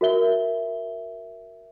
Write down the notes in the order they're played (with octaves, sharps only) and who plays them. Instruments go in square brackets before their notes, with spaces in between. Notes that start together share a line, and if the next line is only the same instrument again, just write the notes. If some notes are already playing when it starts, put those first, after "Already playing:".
[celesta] F#4 A#4 E5 G7